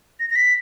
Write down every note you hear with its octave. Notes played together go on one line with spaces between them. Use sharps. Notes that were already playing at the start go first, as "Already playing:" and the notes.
A#6
A#6
B6